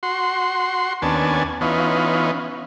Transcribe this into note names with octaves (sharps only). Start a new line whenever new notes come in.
F#4 C6
D#2 B3 C#4 D4 G#5 A5
E3 B3 C#4 D#4 F4